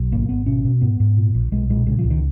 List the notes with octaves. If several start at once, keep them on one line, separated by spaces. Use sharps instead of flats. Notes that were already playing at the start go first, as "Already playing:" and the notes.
Already playing: B1
G#1 A#3
G#1 B3
B2 C#4
B2
G#2 B3
G#2
A#2
A#1
B1 G#3
A#2 G#3
C#3 G#3
F3
C#2
D#3